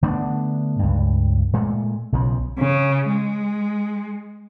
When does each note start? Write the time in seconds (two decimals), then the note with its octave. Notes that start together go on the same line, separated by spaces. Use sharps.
0.03 D3 A3 B3 D4
0.79 C#2 G2
1.53 A#2 G#3 A3
2.12 B1 C#3 F3
2.59 C#3
3.10 G#3